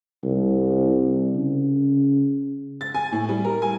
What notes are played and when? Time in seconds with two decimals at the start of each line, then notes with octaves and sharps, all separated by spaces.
0.23 C2
1.35 C#3
2.81 A6
2.94 G#5
3.12 A2
3.29 G3
3.45 A#4
3.62 G#5